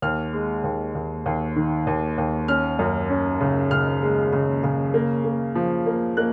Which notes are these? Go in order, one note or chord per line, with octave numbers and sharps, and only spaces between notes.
D#2 F6
G#3
D#2
D#2
D#2
D#3
D#2
D#2
C#4 F6
F#2
C#4
C#3
C#3 F6
G#3
C#3
C#3
A#3
A#3
F3
A#3
A#3 F#6